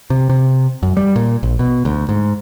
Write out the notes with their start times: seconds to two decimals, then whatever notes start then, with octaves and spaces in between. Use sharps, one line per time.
0.10 C3
0.30 C3
0.83 F#2
0.97 G3
1.16 A#2
1.43 A#1
1.59 B2
1.85 D2
2.09 G#2